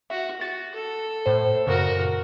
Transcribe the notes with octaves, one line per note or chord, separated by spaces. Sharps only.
F#4 E5
F#4 A6
A4
A2 C5
F#2 A#2 C#3 F#4 A#4